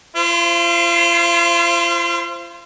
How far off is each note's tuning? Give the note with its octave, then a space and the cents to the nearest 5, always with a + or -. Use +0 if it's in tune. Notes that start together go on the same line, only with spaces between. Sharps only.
F4 -40 C5 +0